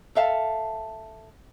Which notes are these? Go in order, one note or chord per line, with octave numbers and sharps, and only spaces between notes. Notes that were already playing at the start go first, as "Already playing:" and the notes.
A4 E5 F5 A5